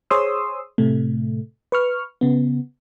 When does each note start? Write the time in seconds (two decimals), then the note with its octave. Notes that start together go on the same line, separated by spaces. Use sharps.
0.10 G#4 C5 C#5 C6 D#6 E6
0.78 A2 C3 A3
1.72 B4 C#6 F6
2.21 C#3 B3